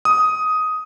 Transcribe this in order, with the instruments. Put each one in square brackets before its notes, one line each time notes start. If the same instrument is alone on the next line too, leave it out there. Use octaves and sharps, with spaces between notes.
[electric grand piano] D#6